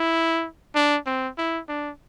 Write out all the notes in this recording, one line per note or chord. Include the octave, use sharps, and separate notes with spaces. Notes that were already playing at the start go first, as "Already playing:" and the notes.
Already playing: E4
D4
C4
E4
D4